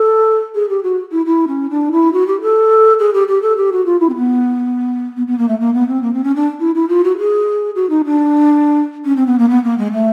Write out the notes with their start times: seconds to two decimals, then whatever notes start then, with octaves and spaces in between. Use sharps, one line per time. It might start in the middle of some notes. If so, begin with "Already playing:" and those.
Already playing: A4
0.55 G#4
0.69 G4
0.83 F#4
1.12 E4
1.26 E4
1.47 C#4
1.70 D4
1.92 E4
2.13 F#4
2.27 G4
2.41 A4
2.99 G#4
3.13 G4
3.28 G4
3.42 A4
3.57 G4
3.72 F#4
3.85 F4
4.00 E4
4.09 C4
4.15 B3
5.16 B3
5.27 B3
5.38 A#3
5.48 A3
5.60 A#3
5.74 B3
5.88 C4
6.02 A#3
6.14 C4
6.24 C#4
6.36 D4
6.60 E4
6.75 E4
6.89 F4
7.04 F#4
7.18 G#4
7.75 F#4
7.90 D#4
8.05 D4
9.05 C#4
9.16 C4
9.27 B3
9.38 A#3
9.49 B3
9.64 A#3
9.78 G#3
9.92 A3